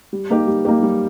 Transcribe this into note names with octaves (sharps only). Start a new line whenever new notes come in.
G3
A#3 D#4 G4
G3
A#3 D#4 G4
G3